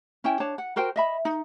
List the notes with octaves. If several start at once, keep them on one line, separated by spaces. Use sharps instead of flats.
C#4 E4 G5 G#5
D4 C#5 A5
F#5
F#4 A#4 C5 G5
D#5 E5 B5
D#4